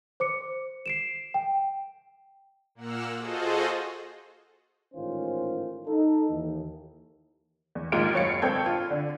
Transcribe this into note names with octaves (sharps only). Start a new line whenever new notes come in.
C5 D6 C#7
C7 D7 E7
G5
A#2 A#3 F#5 E6 F6
F4 F#4 G#4 A4 C5 D#5
A1 G#2 D#3 C#4 F4 C5
D#4 A4
D#2 E3
E2
D#2 G#2 G#3 F4 C6 D7
F#1 F#3 C#5 F5 A6 C#7
G#1 C#2 C4 A4 G5 G#6
F4
D3 D4